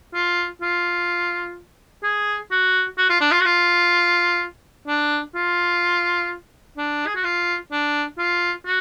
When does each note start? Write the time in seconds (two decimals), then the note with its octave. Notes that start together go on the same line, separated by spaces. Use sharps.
0.14 F4
0.62 F4
2.04 G#4
2.51 F#4
2.98 F#4
3.09 F4
3.20 D4
3.31 F4
3.40 F#4
3.45 F4
4.87 D4
5.35 F4
6.77 D4
7.06 G#4
7.15 F#4
7.24 F4
7.71 D4
8.19 F4
8.66 F#4